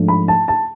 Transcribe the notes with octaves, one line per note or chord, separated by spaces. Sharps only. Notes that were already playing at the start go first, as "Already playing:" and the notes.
Already playing: G#2 F3 A3 D4
B5
A5
A5